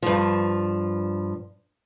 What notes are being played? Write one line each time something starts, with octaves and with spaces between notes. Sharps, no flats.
G2 F3